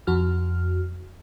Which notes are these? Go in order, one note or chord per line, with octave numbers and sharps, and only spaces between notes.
F2 F#4 F6